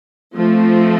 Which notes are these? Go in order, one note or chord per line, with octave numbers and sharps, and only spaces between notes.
F3 A3 C4